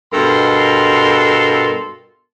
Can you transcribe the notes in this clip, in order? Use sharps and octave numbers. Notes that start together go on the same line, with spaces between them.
G2 B2 A4 A#4 C6